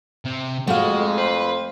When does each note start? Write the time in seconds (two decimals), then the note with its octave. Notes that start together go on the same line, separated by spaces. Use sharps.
0.25 C3
0.67 F2 G#3 A3 F#4 F5
1.18 B4 C5